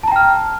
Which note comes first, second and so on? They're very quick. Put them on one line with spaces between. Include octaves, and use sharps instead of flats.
A5 A#5 G5 F6